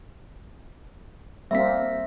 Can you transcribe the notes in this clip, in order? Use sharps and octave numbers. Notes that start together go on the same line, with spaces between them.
G3 A#3 C4 E5 B6